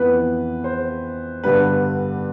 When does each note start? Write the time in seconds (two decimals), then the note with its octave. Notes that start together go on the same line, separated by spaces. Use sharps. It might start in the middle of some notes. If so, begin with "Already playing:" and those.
Already playing: F2 E3 B3 B4
0.64 C5
1.44 G2 D3 G3 B3 B4